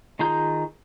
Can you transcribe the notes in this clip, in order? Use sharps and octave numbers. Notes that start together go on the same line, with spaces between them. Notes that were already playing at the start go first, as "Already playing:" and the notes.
D#3 F4 G#4 A#5 G6